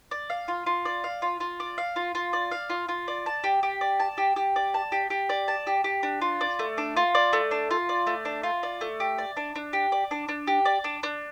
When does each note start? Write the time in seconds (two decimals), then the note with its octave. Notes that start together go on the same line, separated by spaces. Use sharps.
0.11 D5
0.30 F5
0.48 F4
0.66 F4
0.85 D5
1.04 F5
1.22 F4
1.40 F4
1.60 D5
1.78 F5
1.96 F4
2.15 F4
2.33 D5
2.51 F5
2.70 F4
2.89 F4
3.08 D5
3.26 A5
3.44 G4
3.63 G4
3.81 D5
4.00 A5
4.18 G4
4.36 G4
4.56 D5
4.74 A5
4.92 G4
5.10 G4
5.29 D5
5.48 A5
5.67 G4
5.84 G4
6.03 D4
6.21 F4
6.41 D5
6.59 A3
6.78 D4
6.97 F4
7.15 D5
7.33 A3
7.51 D4
7.71 F4
7.89 D5
8.07 A3
8.25 D4
8.43 F4
8.63 D5
8.81 A3
9.00 G4
9.18 D5
9.37 D4
9.56 D4
9.73 G4
9.92 D5
10.11 D4
10.29 D4
10.47 G4
10.65 D5
10.84 D4
11.03 D4